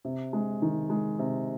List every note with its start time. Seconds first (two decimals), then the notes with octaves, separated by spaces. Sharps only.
0.04 C3
0.33 G#3
0.62 D#3
0.90 G#3
1.19 C3